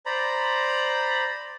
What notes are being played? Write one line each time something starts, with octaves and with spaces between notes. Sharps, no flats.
C5 D5 A#5 B5